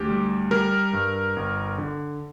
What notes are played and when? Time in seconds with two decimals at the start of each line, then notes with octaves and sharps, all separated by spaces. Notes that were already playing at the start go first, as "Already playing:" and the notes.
Already playing: D2 G4
0.09 G3
0.51 G3 A#4
0.93 G2
1.36 G1
1.78 D3